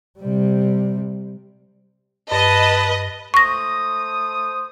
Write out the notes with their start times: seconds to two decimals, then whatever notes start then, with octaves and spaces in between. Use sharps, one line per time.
0.19 C3 G3
2.31 G2 B4 D#5 A5
3.34 A3 C5 C#6 D#6 A#6